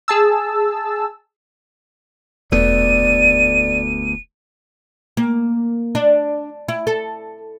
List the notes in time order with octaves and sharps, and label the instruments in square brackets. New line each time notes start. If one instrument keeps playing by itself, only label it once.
[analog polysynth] G#4 A5 E6
[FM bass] E1 [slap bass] D2 A3 B3 [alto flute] D5 [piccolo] D#7
[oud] A#3
D4
E4
A4